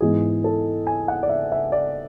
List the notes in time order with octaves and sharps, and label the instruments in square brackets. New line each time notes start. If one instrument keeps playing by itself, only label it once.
[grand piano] G#2 E3 B3 G#4
A4
G#5
F#5
D5
E5
E5
D5